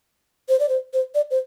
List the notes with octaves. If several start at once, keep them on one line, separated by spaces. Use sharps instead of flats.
C5
D5
C5
C5
D5
C5